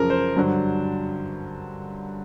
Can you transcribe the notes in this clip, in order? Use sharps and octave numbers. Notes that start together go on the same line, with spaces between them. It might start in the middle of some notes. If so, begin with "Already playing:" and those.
Already playing: F#2 C#3 F3 A#4
C5
G2 D3 F#3